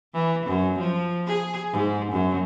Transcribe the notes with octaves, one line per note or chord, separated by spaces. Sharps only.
E3
F#2
F3
G#4
G#2
F#2